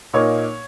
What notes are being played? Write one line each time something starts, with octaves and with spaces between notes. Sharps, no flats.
A#2 A#3 D#4 C#5